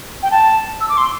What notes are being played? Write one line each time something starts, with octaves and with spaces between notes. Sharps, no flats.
G5
A5
E6
D6
C6